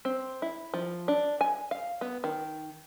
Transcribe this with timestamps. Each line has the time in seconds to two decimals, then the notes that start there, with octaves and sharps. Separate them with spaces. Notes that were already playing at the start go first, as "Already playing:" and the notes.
0.05 C4
0.42 E4
0.74 F3
1.08 D4
1.41 G#5
1.71 F5
2.01 B3
2.24 D#3